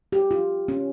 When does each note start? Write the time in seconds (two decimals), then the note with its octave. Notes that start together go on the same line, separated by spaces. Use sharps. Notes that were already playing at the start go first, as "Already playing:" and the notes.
0.12 G4
0.31 F4
0.68 C#4